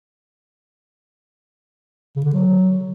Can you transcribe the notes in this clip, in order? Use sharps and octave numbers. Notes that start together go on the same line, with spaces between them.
C#3
D3
F#3